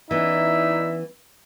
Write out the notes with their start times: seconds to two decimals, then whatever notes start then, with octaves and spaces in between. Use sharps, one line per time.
0.11 E3 B3 C#4 D#4 E4 D5 E5